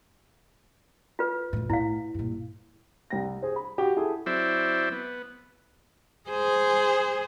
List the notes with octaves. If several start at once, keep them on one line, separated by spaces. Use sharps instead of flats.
F4 B4
A#1 A2
A2 E4 F5
G2 A#2
C2 G5 A#6
G#4 C5
B5
F#4 G4
E4 G#4 A4
F#3 C4 E4 C5 D5 E5
B3
G#4 C5